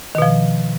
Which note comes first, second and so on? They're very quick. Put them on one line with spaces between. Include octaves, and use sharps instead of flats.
D#3 B2 F3